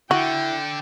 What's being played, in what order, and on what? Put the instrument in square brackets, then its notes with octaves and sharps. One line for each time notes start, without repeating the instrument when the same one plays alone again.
[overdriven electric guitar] D3 [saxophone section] E4 [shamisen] F#4 [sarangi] G5